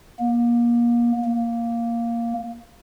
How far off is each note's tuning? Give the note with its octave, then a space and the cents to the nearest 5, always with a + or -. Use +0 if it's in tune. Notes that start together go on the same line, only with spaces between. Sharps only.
A#3 +30
A#3 +0